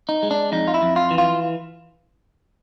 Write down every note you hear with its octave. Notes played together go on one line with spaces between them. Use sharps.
D#4
G#3
D4
F2 D#4
F4
E4
F2
F4
E3
F4